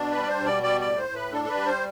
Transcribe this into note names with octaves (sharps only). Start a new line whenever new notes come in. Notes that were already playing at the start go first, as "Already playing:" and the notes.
Already playing: B2 D4
B4
G3
D5
C5
B2
D5
G3 D5
D5
A2
C5
A2
B4
D4 A4
A4
B4
G3
C5